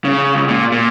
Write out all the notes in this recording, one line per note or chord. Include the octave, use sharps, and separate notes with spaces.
C#3
C#2
A#2
A#2